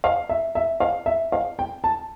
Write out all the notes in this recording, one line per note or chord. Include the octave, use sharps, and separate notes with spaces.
F5
E5
E5
F5
E5
F5
G5
A5